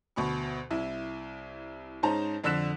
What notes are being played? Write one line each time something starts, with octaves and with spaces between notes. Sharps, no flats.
D2 B2 B5 C#6
C2 E4
G#2 C#4 D#4 C5 A5 A#5
F2 D3 E6 F#6 B6 E7